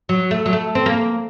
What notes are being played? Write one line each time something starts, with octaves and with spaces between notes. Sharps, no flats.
F#3
A3
F#3
A3
C4
A#3